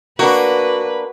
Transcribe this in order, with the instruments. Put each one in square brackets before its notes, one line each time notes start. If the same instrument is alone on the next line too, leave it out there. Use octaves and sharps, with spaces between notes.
[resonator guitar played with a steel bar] A#3 D4 [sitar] F#4 [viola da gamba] B4